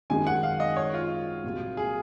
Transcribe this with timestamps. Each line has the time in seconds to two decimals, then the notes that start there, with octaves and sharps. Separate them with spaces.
0.10 G#1 F#2 D#3 G#3 G#5
0.27 F#5
0.43 F5
0.60 D#5
0.76 C#5
0.94 F4
1.44 C2 A#2 F#3 A#3
1.77 G#4